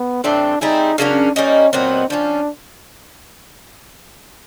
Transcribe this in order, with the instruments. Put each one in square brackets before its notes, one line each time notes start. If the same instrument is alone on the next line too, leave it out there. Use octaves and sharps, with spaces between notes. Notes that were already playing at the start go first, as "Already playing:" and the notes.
Already playing: [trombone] B3
[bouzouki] A2 E3 G3 C4 [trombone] D4
[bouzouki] G3 C4 E4 G#4 [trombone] D#4
[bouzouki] C#3 F#3 A#3 C#4 [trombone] D4
[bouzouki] G3 A#3 D#4 [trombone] C#4
[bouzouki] A#2 F#3 B3 D#4 [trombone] C4
[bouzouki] F3 A#3 C#4 [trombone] D4